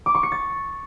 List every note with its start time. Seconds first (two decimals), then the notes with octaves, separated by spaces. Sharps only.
0.06 D6
0.15 C#6
0.23 C#7
0.32 A6